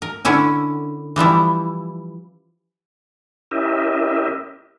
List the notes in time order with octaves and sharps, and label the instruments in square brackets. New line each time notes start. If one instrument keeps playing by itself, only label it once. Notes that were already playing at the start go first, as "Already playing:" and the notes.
[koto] A#4
D3 C#4 E4 G#5
E3 F3 G3 E4
[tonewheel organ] C#4 E4 G4 A#4 D#5 E5